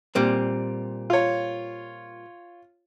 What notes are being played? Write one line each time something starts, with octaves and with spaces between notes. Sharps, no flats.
A#2 G3 C4
F4 C#5